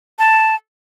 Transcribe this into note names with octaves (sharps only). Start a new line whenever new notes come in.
A5